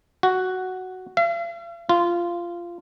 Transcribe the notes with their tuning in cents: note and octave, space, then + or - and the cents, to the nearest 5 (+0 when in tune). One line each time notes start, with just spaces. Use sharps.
F#4 +5
F5 -45
F4 -15